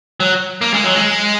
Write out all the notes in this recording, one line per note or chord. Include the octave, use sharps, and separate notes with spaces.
F#3
A#3
G#3
F#3
G#3